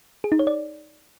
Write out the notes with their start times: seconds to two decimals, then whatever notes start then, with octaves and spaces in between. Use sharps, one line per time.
0.24 G#4
0.32 D#4
0.39 C#5
0.47 D5